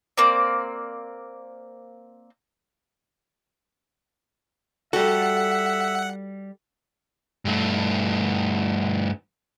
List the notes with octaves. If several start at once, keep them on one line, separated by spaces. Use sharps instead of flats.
A#3 C4 D5
G3 F#4 A4 E5 F#5
G2 A3